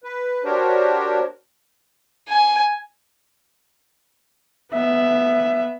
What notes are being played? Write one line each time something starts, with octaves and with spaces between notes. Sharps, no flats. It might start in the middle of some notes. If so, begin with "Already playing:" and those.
B4
D4 F#4 G4 A#4 C5 C#5
G#5
B3 E5